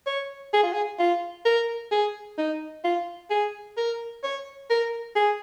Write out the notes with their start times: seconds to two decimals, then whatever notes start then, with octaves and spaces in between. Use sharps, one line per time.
0.06 C#5
0.53 G#4
0.63 F4
0.73 G#4
0.99 F4
1.45 A#4
1.91 G#4
2.38 D#4
2.84 F4
3.30 G#4
3.77 A#4
4.23 C#5
4.70 A#4
5.15 G#4